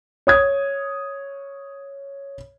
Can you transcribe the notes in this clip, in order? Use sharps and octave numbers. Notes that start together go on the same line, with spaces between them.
C#5 D#6 G#6